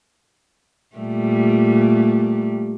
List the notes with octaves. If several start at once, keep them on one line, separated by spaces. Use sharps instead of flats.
A#2 G3 A3